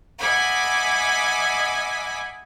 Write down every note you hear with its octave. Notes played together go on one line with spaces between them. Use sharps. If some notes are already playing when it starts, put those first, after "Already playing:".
D#5 E5 F#5 G#5 B5 D6